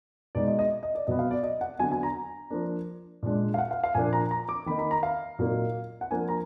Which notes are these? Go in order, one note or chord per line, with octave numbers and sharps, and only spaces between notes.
B2 G#3 D#4 D5
D#5
D#5
D#5
D5
B2 F#3 B3 D#5
F5
D5
D#5
F#5
D3 F#3 B3 D4 G#5
G#5
A#5
F3 A#3 D4
A#2 G#3 D4
F5
F#5
F5
F5
A#2 F3 A#3 D4 G#5
A#5
A#5
D6
D#3 A#3 D#4 B5
B5
A#5
F5
A#2 F#3 A#3 D#4
F#5
F3 A#3 D4 G#5
A#5